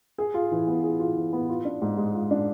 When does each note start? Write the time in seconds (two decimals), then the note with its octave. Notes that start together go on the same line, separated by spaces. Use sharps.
0.18 G#4
0.34 F4
0.51 E3
0.67 B3
0.84 G#4
1.00 F4
1.17 E3
1.33 B3
1.49 F4
1.65 D4
1.82 G#2
1.97 G#3
2.14 F4
2.31 D4